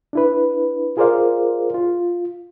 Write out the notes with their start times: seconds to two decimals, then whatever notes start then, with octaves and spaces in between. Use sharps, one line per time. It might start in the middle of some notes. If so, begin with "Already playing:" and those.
0.13 D4 E4 B4
0.97 F4 G#4 A#4 C5 D5 F5
1.74 F4